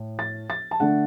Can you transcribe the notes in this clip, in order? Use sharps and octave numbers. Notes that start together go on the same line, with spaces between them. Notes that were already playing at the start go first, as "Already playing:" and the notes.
Already playing: A2
A6
A6
A5
D3 A3 D4 F#5